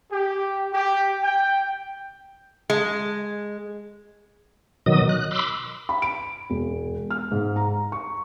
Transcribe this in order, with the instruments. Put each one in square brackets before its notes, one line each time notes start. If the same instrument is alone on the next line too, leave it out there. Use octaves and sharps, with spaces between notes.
[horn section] G4
G4
G5
[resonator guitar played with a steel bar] G#3
[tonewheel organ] B2 D#3 F#3 D#5 D#6
F#6
B5 C6 D6 E6
[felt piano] B5
D7
E1
F6
G#2
A#5
C#6